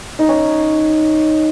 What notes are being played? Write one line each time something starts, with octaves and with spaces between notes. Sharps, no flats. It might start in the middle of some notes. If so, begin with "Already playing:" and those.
D#4
C#4